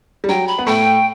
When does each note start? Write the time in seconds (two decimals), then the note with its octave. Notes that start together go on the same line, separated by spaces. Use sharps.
0.24 G3
0.29 F#3 G5
0.48 B5
0.58 B3
0.66 A2 A3 G5